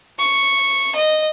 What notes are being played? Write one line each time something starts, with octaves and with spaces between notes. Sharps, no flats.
C#6
D#5